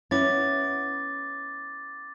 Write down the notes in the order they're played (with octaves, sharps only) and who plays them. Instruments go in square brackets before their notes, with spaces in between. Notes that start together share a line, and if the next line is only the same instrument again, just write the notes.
[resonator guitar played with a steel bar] B3 E4 [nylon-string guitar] C#4 [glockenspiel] D6 A6